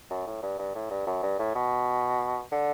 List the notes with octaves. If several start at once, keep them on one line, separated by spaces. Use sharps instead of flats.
F#2
A2
G2
G2
A2
G2
F#2
G2
A2
B2
D3